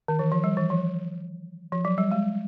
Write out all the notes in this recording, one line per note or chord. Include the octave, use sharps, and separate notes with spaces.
D#3
E3
F3
G3
E3
F3
F3
F#3
G3
G#3